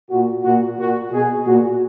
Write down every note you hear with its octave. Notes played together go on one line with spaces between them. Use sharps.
A#2 F#4
A#2 F#4
A#2 F#4
B2 G#4
A#2 F#4